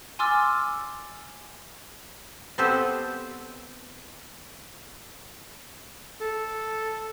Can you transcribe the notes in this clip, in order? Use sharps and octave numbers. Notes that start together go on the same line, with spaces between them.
G#5 C6 D6 E6 F6 A6
B3 C4 G4 A4 B4 C5
A4